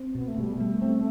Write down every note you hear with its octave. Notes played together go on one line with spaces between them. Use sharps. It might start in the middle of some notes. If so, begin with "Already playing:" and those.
Already playing: C4
B2 B3
A3
B2 G3
A3
G3
C4